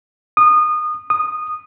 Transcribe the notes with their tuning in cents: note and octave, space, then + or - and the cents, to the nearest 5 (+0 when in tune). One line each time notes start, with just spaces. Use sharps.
D#6 -25
D#6 -15